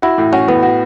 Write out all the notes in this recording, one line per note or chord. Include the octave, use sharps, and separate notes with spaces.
E4 F#4
A2
C#4 F#4
A2 B3
F#4